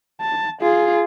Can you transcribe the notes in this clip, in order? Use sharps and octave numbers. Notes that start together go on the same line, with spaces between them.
A5
F4 G#4